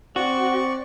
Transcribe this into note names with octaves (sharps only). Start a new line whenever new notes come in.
C4 F#4 D5 C#6